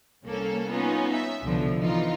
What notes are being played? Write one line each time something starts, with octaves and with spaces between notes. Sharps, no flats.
C2 A#3 C#4 A4
B3 C#4 D#4 F4
E5
C2 B2 D3 F3
E3 D#4 F4